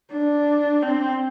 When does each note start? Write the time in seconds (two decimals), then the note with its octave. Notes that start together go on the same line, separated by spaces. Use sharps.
0.12 D4
0.82 C4